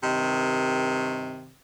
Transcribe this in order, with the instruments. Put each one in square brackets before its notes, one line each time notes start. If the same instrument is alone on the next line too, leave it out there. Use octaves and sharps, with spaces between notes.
[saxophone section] G2 C3 D#3